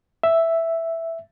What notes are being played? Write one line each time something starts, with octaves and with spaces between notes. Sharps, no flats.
E5